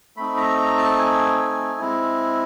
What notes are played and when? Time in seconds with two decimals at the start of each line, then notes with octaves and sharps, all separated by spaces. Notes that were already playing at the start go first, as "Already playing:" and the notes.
0.17 A3 C4 D#4 B5
0.37 A#5
0.57 A#5
0.78 A5
0.98 G#5
1.39 G#5
1.80 G#3 C4 E4